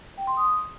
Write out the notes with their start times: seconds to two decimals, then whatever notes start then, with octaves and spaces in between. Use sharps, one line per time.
0.18 G5
0.27 C6
0.37 D#6